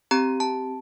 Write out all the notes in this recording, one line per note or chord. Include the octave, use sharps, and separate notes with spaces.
C4 G4 A#5
A5